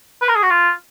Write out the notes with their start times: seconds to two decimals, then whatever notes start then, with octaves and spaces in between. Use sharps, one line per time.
0.22 B4
0.29 A#4
0.36 G#4
0.43 F#4
0.50 F4